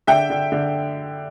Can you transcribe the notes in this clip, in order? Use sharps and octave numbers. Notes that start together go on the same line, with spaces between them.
D3 E5 G5
D3
D3